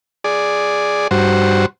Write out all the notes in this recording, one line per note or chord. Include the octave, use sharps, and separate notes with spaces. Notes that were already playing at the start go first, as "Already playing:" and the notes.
G#4 D5
G2 F#4 C5